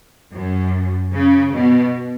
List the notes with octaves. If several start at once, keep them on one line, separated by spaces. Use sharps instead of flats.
F#2
C#3
B2